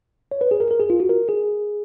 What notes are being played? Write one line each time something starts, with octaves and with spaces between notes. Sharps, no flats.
C#5
B4
G#4
A#4
A#4
G#4
F4
F#4
A#4
G#4